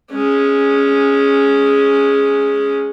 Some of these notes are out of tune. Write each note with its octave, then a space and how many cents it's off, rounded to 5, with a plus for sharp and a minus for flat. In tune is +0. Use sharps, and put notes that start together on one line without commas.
G#3 +0 C#4 +0